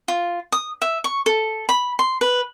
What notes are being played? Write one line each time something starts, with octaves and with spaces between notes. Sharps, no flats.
F4
D#6
E5
C#6
A4
B5
C6
B4